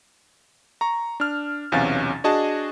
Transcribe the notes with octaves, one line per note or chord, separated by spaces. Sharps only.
A#5 C#6
D4 F6
B1 E2 C3 C#4 F5 A6
D4 F#4 G#4 D#5 A5